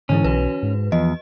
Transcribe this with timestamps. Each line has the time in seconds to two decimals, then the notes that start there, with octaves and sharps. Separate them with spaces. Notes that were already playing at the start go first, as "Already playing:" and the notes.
0.09 G#2 D3 E3 C#4 E4
0.24 B1 F#4 B4
0.63 G#2
0.92 E2 F3 D#5